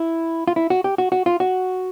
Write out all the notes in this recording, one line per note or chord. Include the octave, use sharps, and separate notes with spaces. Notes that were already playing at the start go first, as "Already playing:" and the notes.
Already playing: E4
F4
E4
F#4
G4
F#4
F#4
F4
F#4